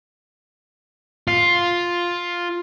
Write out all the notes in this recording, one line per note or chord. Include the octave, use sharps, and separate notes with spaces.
F4